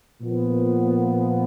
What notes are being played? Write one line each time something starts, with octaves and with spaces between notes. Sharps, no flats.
A#2 F3 B3